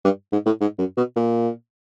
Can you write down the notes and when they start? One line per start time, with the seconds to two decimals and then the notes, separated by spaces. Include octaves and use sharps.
0.05 G2
0.32 G#2
0.46 A2
0.61 G#2
0.79 F#2
0.97 B2
1.16 A#2